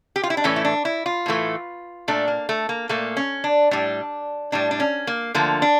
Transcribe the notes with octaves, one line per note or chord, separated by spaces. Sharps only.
G4
F4
E4
D4
A2 E3 A3 C#4
E4
D4
E4
F4
A2 E3 A3
A#2 A3 D4
A#3
A3
A#3
A#2 A3 A#3
C#4
D4
A2 G3 D4
A2 G3 D4
D4
C#4
A#3
D3 F3 A3 A#3
D4